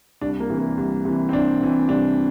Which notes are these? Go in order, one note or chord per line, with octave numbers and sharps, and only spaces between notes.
C2 D4
A#3
C3 E3
A#3
C2
C3 E3
C4
C2 D4
C3 E3
C2 D4